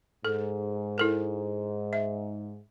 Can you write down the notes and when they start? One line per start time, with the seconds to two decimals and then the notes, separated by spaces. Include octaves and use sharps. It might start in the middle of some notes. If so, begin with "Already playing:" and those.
0.25 G#2 A4
0.98 E4 A4 A#4
1.93 E5